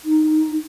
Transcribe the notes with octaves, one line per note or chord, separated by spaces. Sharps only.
D#4